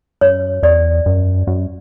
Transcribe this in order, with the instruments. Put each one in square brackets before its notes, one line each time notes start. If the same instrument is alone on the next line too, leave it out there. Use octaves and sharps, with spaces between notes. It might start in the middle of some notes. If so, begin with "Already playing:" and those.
[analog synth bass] F#2 [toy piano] C#5
[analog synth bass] E2 [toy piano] D5
[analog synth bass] F#2
F#2